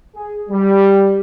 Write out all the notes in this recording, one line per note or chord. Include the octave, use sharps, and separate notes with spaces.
G#4
G3